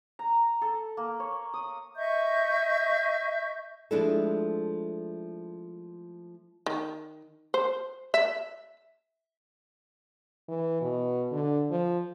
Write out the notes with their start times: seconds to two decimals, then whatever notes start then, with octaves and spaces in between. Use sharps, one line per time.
0.19 A#5
0.62 A4
0.97 A#3
1.20 C#5
1.54 D#6
1.95 D#5 E5 C#6 G6
3.91 F3 G#3 A3 D4 E4 A4
6.66 D#3
7.54 C5
8.14 E5
10.48 E3
10.81 B2
11.32 D3
11.71 F3